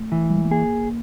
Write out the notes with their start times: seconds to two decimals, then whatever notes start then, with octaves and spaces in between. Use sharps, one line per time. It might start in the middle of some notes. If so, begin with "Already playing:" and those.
Already playing: A3
0.12 E3
0.30 G3
0.37 G#3
0.45 A3
0.51 A#3 G#4